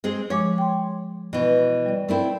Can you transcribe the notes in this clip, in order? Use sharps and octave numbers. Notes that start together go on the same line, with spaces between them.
G#3 C4 G#4
F3 G#3 C#5 D6
G5 C6
B2 E3
G3 D5
A3 C4 E4 A#4 D5 G5